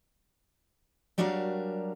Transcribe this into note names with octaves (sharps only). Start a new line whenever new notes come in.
F#3 G3 D4 F#4 A#4 F5